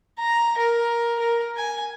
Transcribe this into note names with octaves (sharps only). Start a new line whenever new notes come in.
A#5
A#4
A#4
G#5